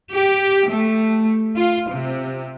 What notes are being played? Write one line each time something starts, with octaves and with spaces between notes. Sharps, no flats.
G4
A3
F4
C3